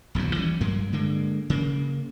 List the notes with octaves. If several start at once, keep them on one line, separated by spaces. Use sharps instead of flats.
D#1 B1 F2 F#3
E3 G3 A#3 C#4
G2 F#3 A#3
D3 G#3 A#3
C#3 A#3